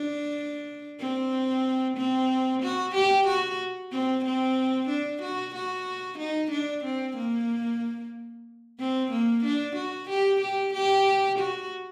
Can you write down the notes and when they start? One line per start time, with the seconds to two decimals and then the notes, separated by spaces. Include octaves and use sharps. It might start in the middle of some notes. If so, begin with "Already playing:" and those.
Already playing: D4
1.00 C4
1.97 C4
2.62 F#4
2.95 G4
3.27 F#4
3.92 C4
4.25 C4
4.89 D4
5.22 F#4
5.55 F#4
6.18 D#4
6.51 D4
6.84 C4
7.17 A#3
8.79 C4
9.11 A#3
9.44 D4
9.76 F#4
10.09 G4
10.41 G4
10.73 G4
11.39 F#4